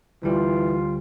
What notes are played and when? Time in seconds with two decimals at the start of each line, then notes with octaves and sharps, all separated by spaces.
0.23 D2 E3 G3 F4